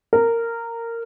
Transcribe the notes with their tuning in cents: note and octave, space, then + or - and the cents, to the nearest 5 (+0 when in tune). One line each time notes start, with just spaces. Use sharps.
A#4 -15